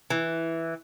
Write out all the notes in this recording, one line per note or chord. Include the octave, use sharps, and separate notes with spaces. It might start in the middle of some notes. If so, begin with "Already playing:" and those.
E3